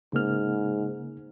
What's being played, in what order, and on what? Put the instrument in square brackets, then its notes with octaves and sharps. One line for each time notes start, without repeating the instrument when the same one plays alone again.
[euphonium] G#2 [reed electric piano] C#3 A#3 F6